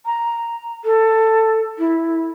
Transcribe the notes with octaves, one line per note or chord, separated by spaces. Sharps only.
A#5
A4
E4